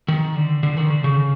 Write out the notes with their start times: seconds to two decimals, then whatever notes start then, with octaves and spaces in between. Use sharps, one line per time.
0.08 D#3
0.36 D3
0.63 D3
0.77 D#3
0.90 D3
1.04 C#3